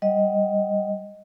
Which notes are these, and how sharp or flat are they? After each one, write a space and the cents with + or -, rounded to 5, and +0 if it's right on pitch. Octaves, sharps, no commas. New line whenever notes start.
G3 +0 D#5 +0 F#5 +0